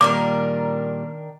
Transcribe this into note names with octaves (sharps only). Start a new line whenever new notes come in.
A#2 D#3 G3 A#3 D4 A#4 D6